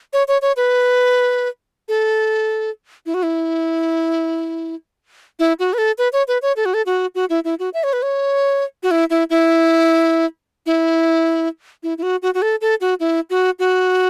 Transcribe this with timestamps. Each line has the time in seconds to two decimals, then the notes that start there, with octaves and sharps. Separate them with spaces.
0.13 C#5
0.28 C#5
0.42 C#5
0.57 B4
1.88 A4
3.06 E4
3.14 F#4
3.23 E4
5.39 E4
5.59 F#4
5.73 B4
5.78 A4
5.98 B4
6.13 C#5
6.28 B4
6.42 C#5
6.57 A4
6.65 F#4
6.74 A4
6.86 F#4
7.15 F#4
7.30 E4
7.44 E4
7.59 F#4
7.74 E5
7.84 C#5
7.93 B4
8.02 C#5
8.83 F#4
8.91 E4
9.10 E4
9.30 E4
10.66 E4
11.83 E4
11.98 E4
12.03 F#4
12.22 F#4
12.34 F#4
12.42 A4
12.61 A4
12.81 F#4
13.00 E4
13.30 F#4
13.59 F#4